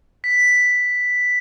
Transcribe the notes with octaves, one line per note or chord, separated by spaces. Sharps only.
B6